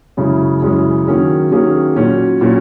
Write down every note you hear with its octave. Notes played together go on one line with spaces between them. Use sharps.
F#2 C#3 G#3 C#4 E4
F#2 C#3 G#3 C#4 E4
D#3 F#3 A#3 C#4 G#4
D#3 F#3 A#3 C#4 G#4
A#2 F#3 C#4
A#2 F#3 C#4